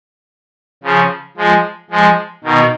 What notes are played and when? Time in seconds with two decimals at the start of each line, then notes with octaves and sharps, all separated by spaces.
0.83 C#3 F3
1.37 F3 G#3
1.91 F3 G#3
2.44 B2 D#3